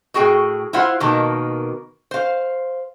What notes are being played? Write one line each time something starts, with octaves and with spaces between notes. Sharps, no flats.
A2 F#4 G#4 G5
E4 F4 C5 F#5
B2 D#3 A#3 A5
C5 F5